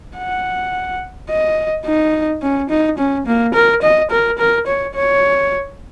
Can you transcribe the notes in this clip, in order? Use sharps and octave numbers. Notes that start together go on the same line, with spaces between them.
F#5
D#5
D#4
C#4
D#4
C#4
A#3
A#4
D#5
A#4
A#4
C#5
C#5